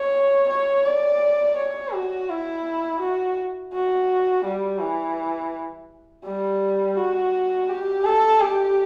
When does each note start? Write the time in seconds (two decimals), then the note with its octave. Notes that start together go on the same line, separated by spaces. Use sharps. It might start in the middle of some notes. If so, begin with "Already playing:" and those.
Already playing: C#5
0.49 C#5
0.86 D5
1.57 C#5
1.93 F#4
2.29 E4
3.01 F#4
3.73 F#4
4.45 G3
4.81 E3
6.25 G3
6.97 F#4
7.69 G4
8.05 A4
8.40 G4